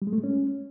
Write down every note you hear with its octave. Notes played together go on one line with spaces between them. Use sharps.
G3
G#3
A3
G#3
C#4